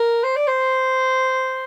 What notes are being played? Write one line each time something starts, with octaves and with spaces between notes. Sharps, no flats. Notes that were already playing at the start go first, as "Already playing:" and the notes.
Already playing: A#4
C5
D5
C5